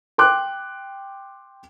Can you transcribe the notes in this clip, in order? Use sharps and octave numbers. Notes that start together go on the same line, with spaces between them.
G5 C6 D6 F#6